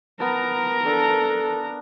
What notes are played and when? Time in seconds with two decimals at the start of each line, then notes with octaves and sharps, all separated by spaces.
0.20 B3 A#4 A5 A#5
0.86 D4 A4